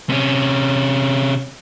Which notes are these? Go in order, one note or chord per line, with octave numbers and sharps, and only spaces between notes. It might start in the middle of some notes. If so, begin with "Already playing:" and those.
C3 C#4